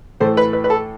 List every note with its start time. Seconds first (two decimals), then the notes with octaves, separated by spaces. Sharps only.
0.20 A2 E3 A3 C5
0.37 B4
0.53 B4
0.64 B4
0.70 A4